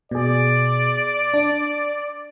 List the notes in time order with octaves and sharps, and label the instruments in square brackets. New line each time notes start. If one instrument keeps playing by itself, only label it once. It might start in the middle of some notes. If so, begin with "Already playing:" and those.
[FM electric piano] B2 G#4 [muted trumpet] D5
[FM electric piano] D4